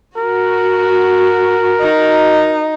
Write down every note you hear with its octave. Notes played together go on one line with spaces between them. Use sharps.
F#4 A#4
D#4